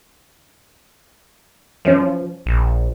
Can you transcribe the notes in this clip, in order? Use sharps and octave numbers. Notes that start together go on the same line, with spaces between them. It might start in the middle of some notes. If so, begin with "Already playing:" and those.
F#2 E3 F3 C#4
A#1